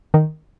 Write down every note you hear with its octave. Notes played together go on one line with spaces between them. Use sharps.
D#3